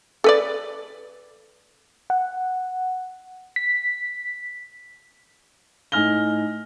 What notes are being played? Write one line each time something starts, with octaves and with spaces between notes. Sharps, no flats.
A4 B4 D5
F#5
B6
A2 D#4 G#5 F6 A#6 G7